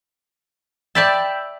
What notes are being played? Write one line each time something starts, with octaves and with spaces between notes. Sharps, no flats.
D5 E5 G5 A5 B5 E6